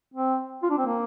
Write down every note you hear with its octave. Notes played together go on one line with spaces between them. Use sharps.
C4
F4
D4
C4
A#3